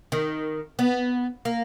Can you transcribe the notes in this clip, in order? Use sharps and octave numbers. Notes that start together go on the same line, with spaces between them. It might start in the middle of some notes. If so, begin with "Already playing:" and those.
D#3
B3
A#3